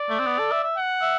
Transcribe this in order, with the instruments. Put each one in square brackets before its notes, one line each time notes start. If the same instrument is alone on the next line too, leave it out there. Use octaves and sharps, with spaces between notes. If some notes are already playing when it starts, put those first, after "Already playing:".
Already playing: [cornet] D5
[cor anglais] A3
C4
B3
A4
E5
E5
[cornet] F#5
[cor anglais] E5